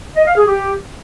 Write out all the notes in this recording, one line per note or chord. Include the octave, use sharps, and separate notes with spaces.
D#5
F5
G#4
G4